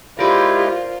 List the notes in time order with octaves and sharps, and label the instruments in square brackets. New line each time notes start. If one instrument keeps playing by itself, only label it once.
[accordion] G#3 E4 [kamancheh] F4 [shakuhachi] G4 [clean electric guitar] A#4 C5 D5